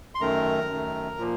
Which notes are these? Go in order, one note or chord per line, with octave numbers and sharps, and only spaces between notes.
C6
F#2 D#3 A3 A#4 A#5
F#2 D#3 A3
A#2 F3 A#3